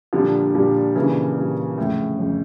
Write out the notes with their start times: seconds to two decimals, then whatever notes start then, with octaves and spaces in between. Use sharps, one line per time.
0.13 A#2 D3 F3 G3 D4
0.55 A#2 G3 D4
0.96 A#2 C#3 E3 G3 D4
1.37 A#2 G3 D4
1.78 G1 F2 A2 C#3
2.19 F2 C#3